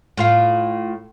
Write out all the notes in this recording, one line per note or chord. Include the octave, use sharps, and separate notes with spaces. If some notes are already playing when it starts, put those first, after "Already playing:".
A2 F4 F5